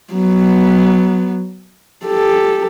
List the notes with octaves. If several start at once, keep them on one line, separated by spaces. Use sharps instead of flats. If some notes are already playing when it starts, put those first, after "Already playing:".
F#3 B3
G4 A4